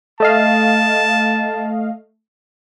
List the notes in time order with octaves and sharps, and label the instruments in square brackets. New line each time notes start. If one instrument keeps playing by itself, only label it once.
[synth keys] A3 D#5 F5 [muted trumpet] A5